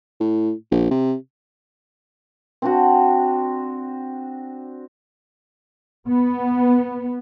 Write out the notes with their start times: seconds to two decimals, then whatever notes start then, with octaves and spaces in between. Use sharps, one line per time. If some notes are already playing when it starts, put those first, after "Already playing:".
0.20 A2
0.72 A#1
0.91 C3
2.62 C4 D4 F#4
6.10 B3